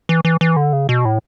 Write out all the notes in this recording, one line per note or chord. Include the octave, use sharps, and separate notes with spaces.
E3
E3
E3
D3
C#3
B2
A2